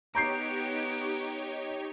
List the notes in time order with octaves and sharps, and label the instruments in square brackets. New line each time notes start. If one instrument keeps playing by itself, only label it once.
[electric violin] B3 D7 [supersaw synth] D#4 G4 C#5 [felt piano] A#5 G6 C7